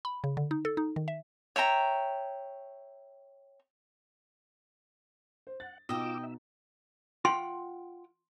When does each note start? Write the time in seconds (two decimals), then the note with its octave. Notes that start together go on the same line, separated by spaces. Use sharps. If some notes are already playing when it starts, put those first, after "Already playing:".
0.05 B5
0.24 C#3
0.37 D3
0.51 D#4
0.65 A4
0.77 D#4
0.96 D#3
1.08 E5
1.56 C#5 E5 G5 A#5
5.47 C5
5.60 F#5 A6
5.89 B2 D#4 F4 D#5 G5 D6 E6
6.23 E5
7.25 F4 F#5 G5 C6